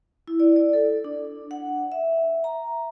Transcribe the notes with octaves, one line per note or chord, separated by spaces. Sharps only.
E4
D5
D5
A4
D4
F#5
E5
A#5